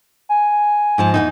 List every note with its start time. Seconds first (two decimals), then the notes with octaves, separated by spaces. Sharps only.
0.29 G#5
0.98 G#2 F3 A5
1.14 E2 C3 D#4